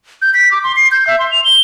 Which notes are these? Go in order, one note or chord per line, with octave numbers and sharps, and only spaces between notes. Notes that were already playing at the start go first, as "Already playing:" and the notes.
G6
B6
D6
C6
C7
G6
E5
C6
F7
G7